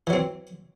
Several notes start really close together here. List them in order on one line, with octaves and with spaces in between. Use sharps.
E3 F#3 C4